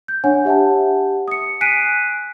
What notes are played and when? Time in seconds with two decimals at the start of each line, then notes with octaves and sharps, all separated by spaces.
0.08 G6
0.24 D4 C#5 F#5 G#5
0.45 G4 E5 F#5 A5
1.28 D#6 C#7
1.61 G#5 F#6 B6 C7 D7 D#7